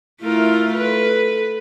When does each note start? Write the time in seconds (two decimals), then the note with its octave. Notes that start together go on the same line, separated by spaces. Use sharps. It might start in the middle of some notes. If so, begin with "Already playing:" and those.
0.22 A3 E4 F4 A#4
0.74 A4 B4